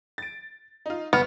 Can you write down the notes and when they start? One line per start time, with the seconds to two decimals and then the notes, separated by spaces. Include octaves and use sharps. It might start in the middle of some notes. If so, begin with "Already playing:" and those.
0.18 A6 D7
0.86 D#4 F4
1.13 G1 B3 F6